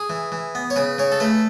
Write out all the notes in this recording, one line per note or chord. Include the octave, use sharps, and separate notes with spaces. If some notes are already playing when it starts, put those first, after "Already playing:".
Already playing: G#4
E3
E3
B3
C#5
C#3 B4
C#3 C#5
A4
A3 B4